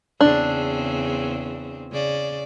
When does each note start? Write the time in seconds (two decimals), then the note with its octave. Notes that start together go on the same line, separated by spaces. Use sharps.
0.21 E2 C#3 C4 D4
1.92 C#3 D5